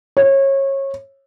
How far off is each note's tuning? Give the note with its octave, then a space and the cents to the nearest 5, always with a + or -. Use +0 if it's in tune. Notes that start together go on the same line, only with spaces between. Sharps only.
C#5 -25